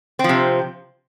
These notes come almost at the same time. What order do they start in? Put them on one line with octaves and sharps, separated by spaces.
C4 F3 C3